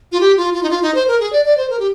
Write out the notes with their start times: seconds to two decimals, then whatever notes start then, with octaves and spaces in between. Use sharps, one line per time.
0.12 F4
0.21 G4
0.37 F4
0.53 F4
0.63 D#4
0.70 F4
0.82 D#4
0.95 C5
1.08 A#4
1.20 G#4
1.33 D5
1.45 D5
1.57 C5
1.70 A#4
1.79 G4